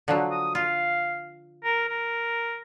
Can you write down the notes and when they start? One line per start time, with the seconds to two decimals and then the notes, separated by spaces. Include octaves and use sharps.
0.08 D3 F3 F#3
0.31 D#6
0.55 F4 F5
1.64 A#4
1.88 A#4